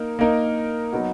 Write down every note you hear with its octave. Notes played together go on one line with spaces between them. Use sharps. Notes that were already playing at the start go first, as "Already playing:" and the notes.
Already playing: A#3 D#4 A#4
A#3 D#4 A#4
F#3 B3 D#4 F#4